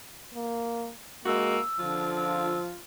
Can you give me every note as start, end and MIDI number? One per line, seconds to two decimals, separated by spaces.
0.34 0.91 58
1.26 1.59 56
1.26 1.60 58
1.26 1.58 66
1.26 2.10 88
1.79 2.58 50
1.79 2.72 53
1.79 2.81 65
2.15 2.58 88